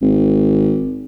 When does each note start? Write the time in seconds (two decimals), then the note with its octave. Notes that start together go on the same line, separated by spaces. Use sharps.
0.02 G#1